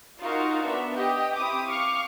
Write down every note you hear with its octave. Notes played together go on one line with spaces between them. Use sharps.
D#4 F4 F#4 A#4 F5
B3 D4 E5
G4 D#5 G5
C4 E4 G4 D6 D#6
F5 C#6 D6 F6 C#7